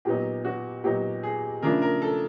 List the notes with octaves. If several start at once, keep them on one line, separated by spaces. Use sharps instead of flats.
A#2 F#3 B3 D#4 G4
F#4
A#2 F#3 B3 D#4 G4
G#4
C#3 F3 A3 D4 A#4
A#4
A4